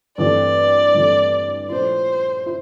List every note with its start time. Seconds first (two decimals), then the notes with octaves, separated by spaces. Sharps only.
0.18 G2 E3 A3 C4 D5
0.94 G2 E3 A3 C4
1.70 A#2 F3 A3 C#4 E4 C5
2.46 E4